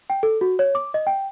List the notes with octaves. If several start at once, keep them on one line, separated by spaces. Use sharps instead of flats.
G5
A4
F#4
C#5
D6
D#5
G5